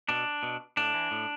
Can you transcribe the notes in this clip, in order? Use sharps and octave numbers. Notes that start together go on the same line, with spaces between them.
B2 D4
B2
A2 D4
E3
A2